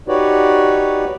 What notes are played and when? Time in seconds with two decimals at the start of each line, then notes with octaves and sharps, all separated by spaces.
0.08 D#4 F#4 G4 B4 C#5 D5